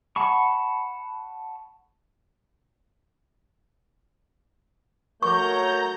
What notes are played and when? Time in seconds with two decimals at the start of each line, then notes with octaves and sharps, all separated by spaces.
0.16 F#5 A5 B5 C#6
5.23 F#3 A3 A#4 C#5 A#5 C#6 G6